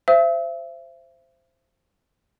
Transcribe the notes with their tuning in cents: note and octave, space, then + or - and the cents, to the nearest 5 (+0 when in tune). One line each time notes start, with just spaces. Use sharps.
C5 +0 E5 +35 E6 -45